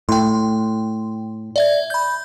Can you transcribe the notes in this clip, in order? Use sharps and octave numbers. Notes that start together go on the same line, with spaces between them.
A2 G5 C6
D5 E5 G#6
B5 G6